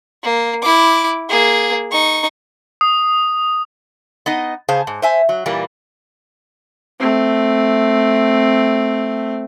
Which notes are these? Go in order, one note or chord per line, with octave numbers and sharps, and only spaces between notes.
A#3
E4 D6
A#3 G#4
D#4 C#6
D#6
B3 D#4 D#5
C#3 G#4 C5 F5 A5
G#2
C5 E5 G#5
F#3
A#2 E3 G3 A#3
A3 C4